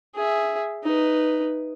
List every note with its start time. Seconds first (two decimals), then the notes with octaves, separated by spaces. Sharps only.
0.15 G#4 E5
0.83 D#4 B4